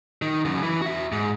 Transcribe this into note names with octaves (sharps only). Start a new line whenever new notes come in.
D#3
F#2 C#3
E3
F#4 E5
G#2